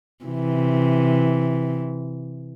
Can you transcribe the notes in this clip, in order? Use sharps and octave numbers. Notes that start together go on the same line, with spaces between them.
C3 E3